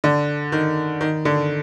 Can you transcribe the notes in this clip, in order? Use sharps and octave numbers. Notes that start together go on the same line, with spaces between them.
D3
D#3
D#3
D3